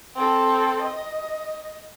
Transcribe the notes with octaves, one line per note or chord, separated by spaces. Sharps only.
C4 A4
D#5